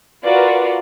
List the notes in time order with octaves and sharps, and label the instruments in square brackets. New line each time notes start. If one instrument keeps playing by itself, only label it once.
[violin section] F4 F#4 A#4 B4 D5